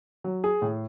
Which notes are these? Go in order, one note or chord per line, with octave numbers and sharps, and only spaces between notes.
F#3
G#4
A2